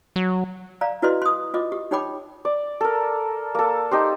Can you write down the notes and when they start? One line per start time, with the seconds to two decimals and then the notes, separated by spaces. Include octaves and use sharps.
0.16 F#3
0.81 D5 F5 A#5
1.02 E4 F#4 B4 D5 D#5 C6
1.22 C6 D#6
1.54 F4 D#5 D6
1.72 G4
1.91 D#4 G4 C#5 G5 B5 D6
2.45 D5
2.81 A4 A#4
3.55 A#3 A4
3.91 D#4 G4 C5